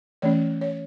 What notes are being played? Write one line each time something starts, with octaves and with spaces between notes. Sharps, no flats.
E3 A3 C#4 C#5
C#5